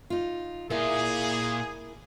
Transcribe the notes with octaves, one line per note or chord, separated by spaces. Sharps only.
D#4 F4
A#2 E4 F4 G#4 A#4